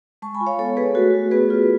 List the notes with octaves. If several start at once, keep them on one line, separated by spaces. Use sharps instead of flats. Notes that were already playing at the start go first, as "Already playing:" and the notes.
G#3 A5 C#6
G#5 B5
F4
C#5 F5
B3 A4 C#5
B3 G#4 B4
A3 F#4 A4
F#4
B3 G#4 B4
F4